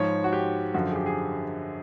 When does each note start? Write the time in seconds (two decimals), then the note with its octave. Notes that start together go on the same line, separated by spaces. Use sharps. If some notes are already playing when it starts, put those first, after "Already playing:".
Already playing: G#2 F3 C#5
0.24 F#4
0.33 G4
0.74 F#2 D3 F3 F#4
0.91 G#4
0.96 G4
1.06 G#4